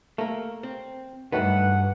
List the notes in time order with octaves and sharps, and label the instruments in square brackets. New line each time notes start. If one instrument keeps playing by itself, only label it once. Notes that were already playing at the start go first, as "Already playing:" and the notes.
[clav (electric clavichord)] A3 [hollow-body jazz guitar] A#3 A#4
[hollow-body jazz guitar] C4
[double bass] G2 [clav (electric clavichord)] D#3 F#3 A3 [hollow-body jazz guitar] A4 B4 [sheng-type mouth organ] F#5